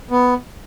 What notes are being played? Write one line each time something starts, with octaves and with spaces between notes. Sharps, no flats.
B3